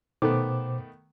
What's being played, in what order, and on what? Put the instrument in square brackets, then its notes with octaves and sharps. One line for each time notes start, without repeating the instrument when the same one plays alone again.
[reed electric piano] B2 C5 D6 [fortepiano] D#3 A3 B3